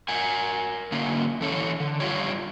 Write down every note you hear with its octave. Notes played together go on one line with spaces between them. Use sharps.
A#4 F#5 G#5
D3 A#3 C#4
E3 A4 C#5
D3
G2 G3 F4 G4 C#5